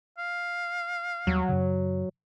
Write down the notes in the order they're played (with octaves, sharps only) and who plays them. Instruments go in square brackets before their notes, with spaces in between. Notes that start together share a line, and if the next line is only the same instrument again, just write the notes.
[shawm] F5
[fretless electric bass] D#2 G3 [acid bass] F#3
[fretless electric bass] F#2 C#3